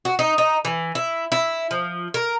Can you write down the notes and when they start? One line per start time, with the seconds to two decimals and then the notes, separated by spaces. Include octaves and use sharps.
0.05 F#4
0.19 D#4
0.38 D#4
0.65 E3
0.95 E4
1.32 E4
1.71 F3
2.14 A#4